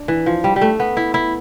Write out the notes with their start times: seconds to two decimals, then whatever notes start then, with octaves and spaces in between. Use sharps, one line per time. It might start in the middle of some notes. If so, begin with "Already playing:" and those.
Already playing: D4
0.08 E3
0.26 F3
0.44 G3
0.56 G3
0.61 A3
0.80 B3
0.97 E4
1.14 E4